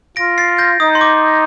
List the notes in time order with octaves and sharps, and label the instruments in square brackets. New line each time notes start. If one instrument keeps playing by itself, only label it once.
[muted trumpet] F4 [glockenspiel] A#6 D7
[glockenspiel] A6 C7
G6 A#6
[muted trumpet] D#4 [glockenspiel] D#6
[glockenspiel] C6
D6